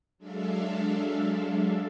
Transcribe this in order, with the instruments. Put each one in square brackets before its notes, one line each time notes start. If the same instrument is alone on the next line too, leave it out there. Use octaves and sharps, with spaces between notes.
[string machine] F#3 G#3 D4 A4 E5 F5